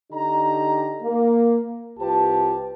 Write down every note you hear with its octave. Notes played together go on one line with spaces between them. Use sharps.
D3 D#4 G4 A#5
A#3
C2 F4 G4 B4 A5